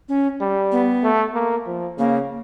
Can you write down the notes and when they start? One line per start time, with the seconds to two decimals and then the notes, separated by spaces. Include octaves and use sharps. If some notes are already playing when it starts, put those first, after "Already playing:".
0.09 C#4
0.41 G3
0.72 B3
1.04 A3
1.34 A#3
1.67 F3
1.98 C#3 A#3